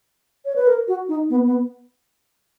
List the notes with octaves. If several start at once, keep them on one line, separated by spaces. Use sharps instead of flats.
C#5
B4
A#4
F#4
D#4
B3
B3